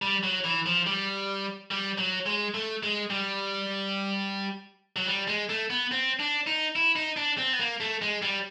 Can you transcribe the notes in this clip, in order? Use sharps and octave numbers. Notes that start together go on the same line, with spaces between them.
G3
F#3
E3
F3
G3
G3
F#3
G#3
A3
G#3
G3
F#3
G3
G#3
A3
B3
C4
D4
D#4
E4
D#4
D4
C4
B3
A#3
A3
G#3
G3